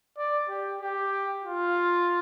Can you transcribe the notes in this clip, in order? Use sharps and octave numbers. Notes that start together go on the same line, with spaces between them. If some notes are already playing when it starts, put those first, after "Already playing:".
D5
G4
G4
F4